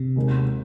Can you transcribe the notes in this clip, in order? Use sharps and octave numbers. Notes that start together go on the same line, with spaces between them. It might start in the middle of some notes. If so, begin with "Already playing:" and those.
Already playing: C3
D#2 D#3 G#3 D#4